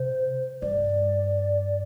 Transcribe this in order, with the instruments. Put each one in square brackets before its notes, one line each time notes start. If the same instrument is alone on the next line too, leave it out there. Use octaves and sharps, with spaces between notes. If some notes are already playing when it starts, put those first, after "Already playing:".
Already playing: [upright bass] C3 [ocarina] C5
[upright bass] G2 [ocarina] D5